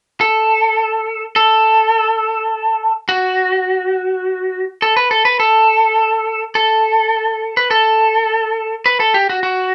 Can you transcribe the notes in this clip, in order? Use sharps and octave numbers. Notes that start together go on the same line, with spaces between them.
A4
A4
F#4
A4
B4
A4
B4
A4
A4
B4
A4
B4
A4
G4
F#4
F#4